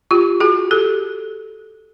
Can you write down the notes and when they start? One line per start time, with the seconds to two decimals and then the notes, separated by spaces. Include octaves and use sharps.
0.11 F4 G4
0.40 F#4 G#4
0.71 G4 A4